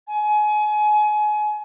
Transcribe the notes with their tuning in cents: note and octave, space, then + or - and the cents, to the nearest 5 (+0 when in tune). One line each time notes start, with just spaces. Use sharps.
G#5 +30